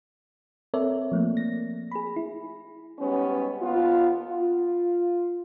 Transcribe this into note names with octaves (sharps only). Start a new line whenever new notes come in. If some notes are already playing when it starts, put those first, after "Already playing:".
C4 A4 A#4 C#5 D5 E5
F3 A3 A#3
A#6
G#4 B5
E4
G#2 G3 B3 C#4
D#2 B3 F4
F4